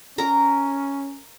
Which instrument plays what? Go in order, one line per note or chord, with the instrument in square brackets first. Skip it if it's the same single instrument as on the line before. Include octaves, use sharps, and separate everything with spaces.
[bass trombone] C#4 [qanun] A#4 A#5